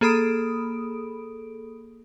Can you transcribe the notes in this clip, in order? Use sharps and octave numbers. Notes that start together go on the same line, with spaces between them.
A#3 G#4 A4 B5 D#6 D7